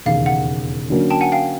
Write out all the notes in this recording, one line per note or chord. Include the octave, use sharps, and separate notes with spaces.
E1 D#2 C#3 F5
F#5
D3 F#3 A#3 C#4
G5 A5
F#5 G#5
F5 G5